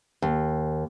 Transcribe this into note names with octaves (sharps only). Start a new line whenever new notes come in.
D#2